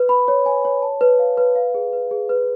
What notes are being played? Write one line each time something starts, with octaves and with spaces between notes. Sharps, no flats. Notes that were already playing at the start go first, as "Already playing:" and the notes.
Already playing: B4
B5
C#5
G#5
C#5
A5
B4
F5
B4
F5
G#4
B4
G#4
B4